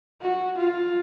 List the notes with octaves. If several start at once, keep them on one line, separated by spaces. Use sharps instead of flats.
F#4
F4